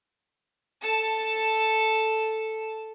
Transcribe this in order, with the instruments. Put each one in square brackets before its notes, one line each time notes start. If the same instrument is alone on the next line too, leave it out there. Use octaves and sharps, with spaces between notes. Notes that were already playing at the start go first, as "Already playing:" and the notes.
[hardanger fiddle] A4 A5